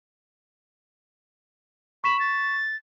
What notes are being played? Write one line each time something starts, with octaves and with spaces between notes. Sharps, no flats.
B5 C#6 B6 E7
A6